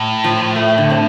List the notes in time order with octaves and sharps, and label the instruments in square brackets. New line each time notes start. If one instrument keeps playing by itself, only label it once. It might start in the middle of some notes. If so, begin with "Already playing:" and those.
Already playing: [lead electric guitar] A2
[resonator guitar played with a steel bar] F3
A3
D3
C4